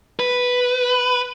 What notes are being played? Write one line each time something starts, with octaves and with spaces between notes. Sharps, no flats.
B4